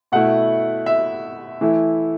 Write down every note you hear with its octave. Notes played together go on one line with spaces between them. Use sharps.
B2 A3 E4 F#5
E5
E3 A3 E4